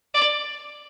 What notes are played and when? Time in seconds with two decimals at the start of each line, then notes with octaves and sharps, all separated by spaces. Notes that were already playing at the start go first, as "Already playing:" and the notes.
0.14 D5